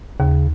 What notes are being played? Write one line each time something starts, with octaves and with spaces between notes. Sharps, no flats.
D#2 C#3